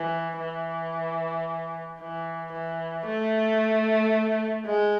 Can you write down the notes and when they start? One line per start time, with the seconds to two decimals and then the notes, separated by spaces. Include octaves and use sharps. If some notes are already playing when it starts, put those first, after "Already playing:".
Already playing: E3
0.39 E3
2.00 E3
2.52 E3
3.06 A3
4.66 G#3